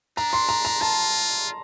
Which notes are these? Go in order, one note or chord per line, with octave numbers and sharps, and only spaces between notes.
D4 A#5
C6
A#5
A#5
F4 A5